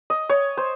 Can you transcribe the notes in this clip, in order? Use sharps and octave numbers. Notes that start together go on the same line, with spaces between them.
D#5
C#5
C5